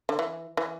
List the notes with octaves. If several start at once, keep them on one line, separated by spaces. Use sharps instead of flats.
D3
E3
E3